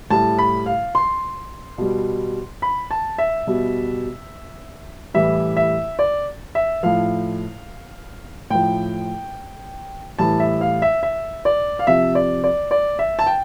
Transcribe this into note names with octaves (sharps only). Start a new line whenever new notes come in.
A2 G3 A5
B5
F5
C6
B2 G3
B5
A5
E5
B2 G3
A2 E3 G3 E5
E5
D5
E5
A2 F3 F5
A2 F3 G5
A2 E3 G3 A5
E5
F5
E5
E5
D5
F5
C3 F3 E5
D5
D5
D5
E5
A5
G5